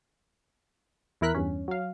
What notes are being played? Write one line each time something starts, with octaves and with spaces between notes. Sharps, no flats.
E2 E3 E4 A#4 F#6 B6
E2 G2 C#4
F#3 F5